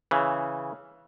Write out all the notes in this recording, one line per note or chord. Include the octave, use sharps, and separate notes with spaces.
C#3 E3